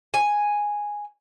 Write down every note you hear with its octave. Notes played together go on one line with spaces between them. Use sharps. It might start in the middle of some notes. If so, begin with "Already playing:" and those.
G#5